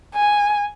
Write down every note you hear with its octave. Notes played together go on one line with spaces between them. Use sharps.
G#5